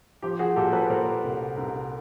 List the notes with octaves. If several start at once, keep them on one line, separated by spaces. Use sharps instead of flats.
F3 G4
F#4 G#4
A#2 G4 A4
A4 B4
A#2 A#4 C5
C2
C2